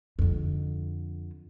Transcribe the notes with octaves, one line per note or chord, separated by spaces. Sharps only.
F2 D3